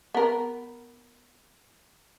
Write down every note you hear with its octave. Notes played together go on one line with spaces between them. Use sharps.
B3 A#4